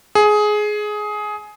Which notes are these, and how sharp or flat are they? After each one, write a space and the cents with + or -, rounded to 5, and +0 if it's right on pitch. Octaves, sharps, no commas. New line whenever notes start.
G#4 +15